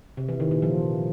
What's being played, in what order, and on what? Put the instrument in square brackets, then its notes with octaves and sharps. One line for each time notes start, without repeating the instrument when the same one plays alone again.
[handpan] C3
E3
D#3
A#2
F3